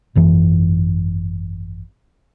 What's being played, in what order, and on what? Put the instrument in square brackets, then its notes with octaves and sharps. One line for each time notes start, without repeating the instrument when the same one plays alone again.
[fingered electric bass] G#1 F#2 E3